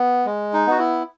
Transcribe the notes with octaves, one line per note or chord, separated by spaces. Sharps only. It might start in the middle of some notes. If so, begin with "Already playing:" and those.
Already playing: B3
G#3
D#4
B3 F#4
E4